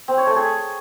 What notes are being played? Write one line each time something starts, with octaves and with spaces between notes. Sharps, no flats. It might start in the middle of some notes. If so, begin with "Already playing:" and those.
C4
C#5
A3
G#4